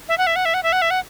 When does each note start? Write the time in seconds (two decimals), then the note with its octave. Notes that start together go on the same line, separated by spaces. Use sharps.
0.09 E5
0.18 F#5
0.27 E5
0.36 F#5
0.45 E5
0.54 F#5
0.63 E5
0.72 F#5
0.82 E5
0.90 F#5